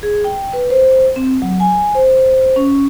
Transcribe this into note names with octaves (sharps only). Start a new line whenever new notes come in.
G#4
G5
B4
C5
C4
F#3
G#5
C5
C#4